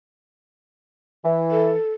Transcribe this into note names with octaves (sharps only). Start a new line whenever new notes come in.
E3
A4